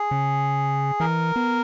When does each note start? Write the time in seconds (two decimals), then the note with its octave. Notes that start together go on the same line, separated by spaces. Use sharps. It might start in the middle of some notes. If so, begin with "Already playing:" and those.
Already playing: G#4
0.11 C#3
1.00 E3 A#4
1.36 B3